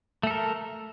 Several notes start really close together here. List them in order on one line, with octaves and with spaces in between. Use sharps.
A3 A4 A#4